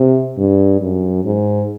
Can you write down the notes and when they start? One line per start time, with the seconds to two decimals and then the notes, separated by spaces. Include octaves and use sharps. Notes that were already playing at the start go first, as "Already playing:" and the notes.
Already playing: C3
0.37 G2
0.80 F#2
1.25 G#2